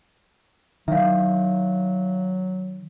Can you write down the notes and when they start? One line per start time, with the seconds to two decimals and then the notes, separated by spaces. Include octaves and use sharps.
0.88 D#3 F#3 E5 F5